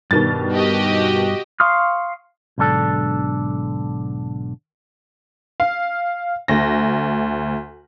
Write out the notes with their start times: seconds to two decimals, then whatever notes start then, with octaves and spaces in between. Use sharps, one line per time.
0.11 G2 B2 D#3 G3 A6
0.52 F#4 G4 D#5
1.60 F5 C6 C#6 D#6 F6
2.58 B1 G#2 D3 D4 A4
5.60 F5
6.48 D2 A#6